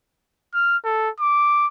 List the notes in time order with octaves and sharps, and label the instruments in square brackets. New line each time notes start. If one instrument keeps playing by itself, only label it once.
[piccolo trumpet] F6
A4
D6